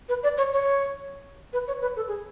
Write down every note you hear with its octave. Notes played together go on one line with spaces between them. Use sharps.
B4
D5
C#5
C#5
B4
C#5
B4
A4
G#4